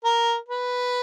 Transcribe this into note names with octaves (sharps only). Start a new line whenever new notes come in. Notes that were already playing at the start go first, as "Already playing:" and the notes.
A#4
B4